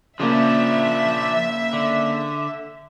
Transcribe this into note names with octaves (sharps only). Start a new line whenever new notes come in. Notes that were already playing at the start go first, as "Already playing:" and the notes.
C#3 F3 A#3 D4 E5
D3